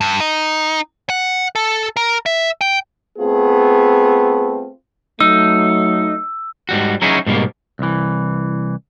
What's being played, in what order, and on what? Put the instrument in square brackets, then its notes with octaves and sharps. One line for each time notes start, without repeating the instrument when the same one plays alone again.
[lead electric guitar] G2
D#4
F#5
A4
A#4
E5
G5
[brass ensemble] A3 B3 C4 F4 G#4
[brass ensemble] F#3 A3 [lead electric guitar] D#4 [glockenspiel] E6
[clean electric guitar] G#2 G3 F#4
F#3 C#4 D#4 E4 F#4 G#4
G#2 B2 G3 A#3
C2 E3